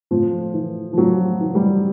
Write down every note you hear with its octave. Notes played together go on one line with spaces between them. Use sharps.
A2 F3
E3
F3
A2 F#3
E3
G3